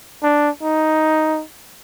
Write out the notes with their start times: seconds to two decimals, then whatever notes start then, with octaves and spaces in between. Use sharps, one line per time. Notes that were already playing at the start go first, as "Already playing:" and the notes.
0.23 D4
0.63 D#4